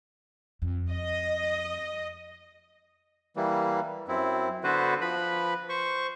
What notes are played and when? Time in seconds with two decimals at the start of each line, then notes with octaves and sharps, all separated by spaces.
0.62 F2
0.91 D#5
3.36 E3 G3 A#3
4.08 F#2 C4 E4
4.64 D3 B3 F#4 B4 C5
5.01 F3 B4 B5
5.69 C5 C#6